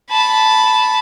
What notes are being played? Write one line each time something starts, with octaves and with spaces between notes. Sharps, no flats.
A5 B5